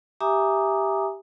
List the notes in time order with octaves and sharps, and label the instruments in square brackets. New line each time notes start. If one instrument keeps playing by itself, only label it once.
[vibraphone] G4 E5 G#5 A#5 D6 D#6